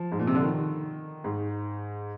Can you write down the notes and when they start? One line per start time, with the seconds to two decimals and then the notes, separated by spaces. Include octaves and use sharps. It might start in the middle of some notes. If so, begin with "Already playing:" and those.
Already playing: F3
0.12 G#2
0.19 A#2
0.27 C3
0.35 D3
0.43 D#3
1.24 G#2